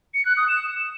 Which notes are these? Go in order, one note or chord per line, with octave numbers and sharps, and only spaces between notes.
C#7
F#6
D#6
E7